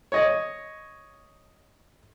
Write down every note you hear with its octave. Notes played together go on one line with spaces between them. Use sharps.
C#5 D#5